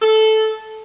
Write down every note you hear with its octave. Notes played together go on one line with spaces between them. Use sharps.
A4